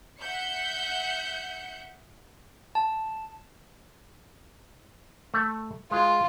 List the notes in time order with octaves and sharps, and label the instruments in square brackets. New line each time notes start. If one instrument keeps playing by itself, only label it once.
[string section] E5 F#5 G6 C#7
[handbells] A5
[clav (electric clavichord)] A3
[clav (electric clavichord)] G#3 [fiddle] F4